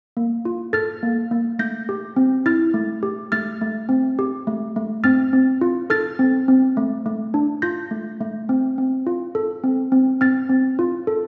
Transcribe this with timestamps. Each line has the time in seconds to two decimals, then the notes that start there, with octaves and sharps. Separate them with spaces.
0.17 A#3
0.45 F4
0.73 A4 F6 A6
1.03 A#3
1.31 A#3
1.59 A3 G6 A#6
1.89 G4
2.16 C4
2.46 E4 F6 A6
2.74 A3
3.03 G4
3.32 A3 F6 A6
3.61 A3
3.89 C4
4.19 G4
4.47 A3
4.76 A3
5.04 C4 F6 A6
5.33 C4
5.61 F4
5.90 A4 F6 A6
6.19 C4
6.48 C4
6.77 A3
7.06 A3
7.34 D4
7.62 F4 G6 A#6
7.91 A3
8.21 A3
8.49 C4
8.78 C4
9.07 F4
9.35 A4
9.64 C4
9.92 C4
10.21 C4 F6 A6
10.49 C4
10.79 F4
11.07 A4